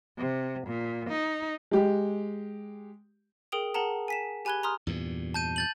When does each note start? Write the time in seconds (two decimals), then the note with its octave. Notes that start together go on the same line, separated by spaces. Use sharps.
0.19 C3
0.67 A#2
1.09 D#4
1.71 G#3 G4
3.52 G#4 A#4 G5 D#6 F7
3.74 G#4 A#4 F#5 A5 A#5
4.08 G#5 B6 E7
4.45 G4 G#5 B5 F#6 G#6 G7
4.63 A#5 C6 D#6 F6
4.87 E2 G2 A#2
5.34 A5 G6 D#7
5.56 G6 A6 F#7